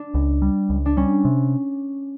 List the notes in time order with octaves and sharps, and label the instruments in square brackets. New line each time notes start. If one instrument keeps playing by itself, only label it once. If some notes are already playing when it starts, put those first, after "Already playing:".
Already playing: [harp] D4
[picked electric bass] C#2
G3
C#2
[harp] D4
[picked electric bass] G3 [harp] C#4
[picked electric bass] C3